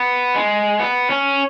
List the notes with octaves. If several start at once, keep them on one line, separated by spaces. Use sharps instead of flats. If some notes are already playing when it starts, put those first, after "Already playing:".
Already playing: B3
G#3
B3
C#4